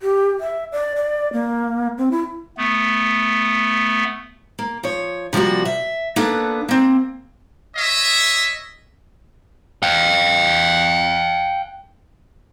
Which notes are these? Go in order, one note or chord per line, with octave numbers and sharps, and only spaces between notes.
G4
E5
D5
D5
A#3
C4
E4
A3 B3
A#3
F3 C#5
C3 F3 G3 A#3 F#4
E5
A#3 B3 D4 A4 B4
A#3 C4
C#5 D#5 E5
F5 G5